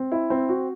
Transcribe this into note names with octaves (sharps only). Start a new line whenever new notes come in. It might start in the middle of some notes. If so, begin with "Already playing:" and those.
Already playing: C4
E4
C4
F#4